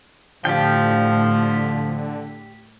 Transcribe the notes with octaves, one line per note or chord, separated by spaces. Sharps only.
A2 D3 F3 G4 G5